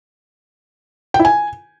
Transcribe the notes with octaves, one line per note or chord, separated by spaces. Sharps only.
G5
E4
G#5